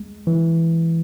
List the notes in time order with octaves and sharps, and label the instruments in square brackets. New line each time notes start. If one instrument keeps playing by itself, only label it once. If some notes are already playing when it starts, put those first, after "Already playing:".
Already playing: [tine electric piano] G#3
E3